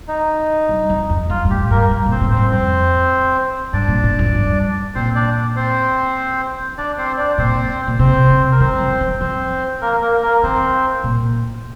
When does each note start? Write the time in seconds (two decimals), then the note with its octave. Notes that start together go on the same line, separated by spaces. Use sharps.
0.08 D#4
0.69 G2
0.90 F2
1.10 F2
1.30 G2 F4
1.45 G2
1.50 A2 G4
1.71 G2 A#3 A#4
1.91 G2
2.06 A#2
2.11 C4 C5
2.21 A2
2.31 C4 C5
2.37 G2
2.52 F2 C4 C5
3.73 G2 D4 D5
3.88 A#2
4.04 A2
4.19 F2
4.35 G2
4.95 A#2 C4 C5
5.15 D4 D5
5.56 C4 C5
6.78 D4 D5
6.98 C4 C5
7.18 D4 D5
7.38 A#2 C4 C5
7.87 A#2
7.99 C3 C4 C5
8.30 C3
8.52 A#4
8.60 D#3 C4 C5
8.80 F3
9.01 D#3
9.21 F3 C4 C5
9.82 A#3 A#4
10.02 A#3 A#4
10.22 A#3 A#4
10.43 D#3 C4 C5
11.04 A#2